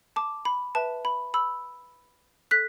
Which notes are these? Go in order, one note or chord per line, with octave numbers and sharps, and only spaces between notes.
A5 D6
B5
B4 E5 A5
B5
B5 E6
A4 F#6 B6